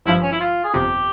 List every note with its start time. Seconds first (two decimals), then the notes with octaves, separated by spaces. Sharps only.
0.06 G#1 G2 F3 E4
0.22 C#4
0.32 E4
0.40 F4
0.64 G#4
0.74 G1 F2 C3 G4